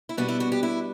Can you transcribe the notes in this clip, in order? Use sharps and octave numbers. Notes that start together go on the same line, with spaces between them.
E4
B2 G3 B3 D4 F#4
E4
F#4
G4
E4